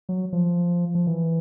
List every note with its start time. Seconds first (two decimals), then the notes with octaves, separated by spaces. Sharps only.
0.09 F#3
0.33 F3
0.95 F3
1.07 E3